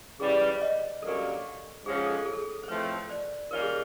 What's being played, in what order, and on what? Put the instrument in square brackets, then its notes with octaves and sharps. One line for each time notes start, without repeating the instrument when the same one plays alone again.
[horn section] C#3 E3 G3 [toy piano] G#4
[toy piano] C5 D5
B4 C#5
C5 D5
C#5 D#5
[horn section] G2 D3 F#3 A#3 C#4 [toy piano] A4
[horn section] G#2 F3 G#3 C#4 F4 [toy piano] G#4
[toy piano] G#4
A4
A4
G#4
A4
C5
[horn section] A2 F3 A3 C4 [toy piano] B4 C#5
[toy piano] C5
C5
C5 D5
[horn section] D#3 G3 A#3 C#4 F4 [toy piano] A#4
[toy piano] G#4